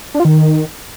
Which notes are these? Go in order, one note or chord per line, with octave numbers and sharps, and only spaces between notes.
D4
F4
D#3